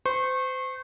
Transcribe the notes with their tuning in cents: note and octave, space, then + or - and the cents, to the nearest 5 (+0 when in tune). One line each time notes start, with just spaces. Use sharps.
C5 -30 C#6 -30